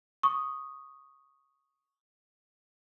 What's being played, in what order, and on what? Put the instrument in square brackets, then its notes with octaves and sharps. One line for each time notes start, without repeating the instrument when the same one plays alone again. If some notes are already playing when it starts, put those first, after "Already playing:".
[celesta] C#6 D#6